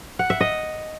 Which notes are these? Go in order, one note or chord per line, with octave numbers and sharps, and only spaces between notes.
F#5
E5
D#5